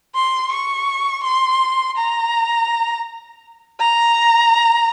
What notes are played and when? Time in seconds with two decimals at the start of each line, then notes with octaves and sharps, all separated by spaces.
0.15 C6
0.52 C#6
1.24 C6
1.97 A#5
3.80 A#5